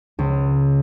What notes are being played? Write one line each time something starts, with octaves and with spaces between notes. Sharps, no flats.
C#2